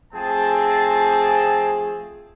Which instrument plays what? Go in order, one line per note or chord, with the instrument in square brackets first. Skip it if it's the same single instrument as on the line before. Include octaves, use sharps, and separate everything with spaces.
[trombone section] F3 A3 G#4 [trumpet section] C4 A5